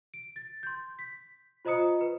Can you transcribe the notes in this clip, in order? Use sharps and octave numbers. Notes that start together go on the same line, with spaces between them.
D7
A6
C6 G6
B6
F4 C5 D#5 A#5 D#6 C#7
B4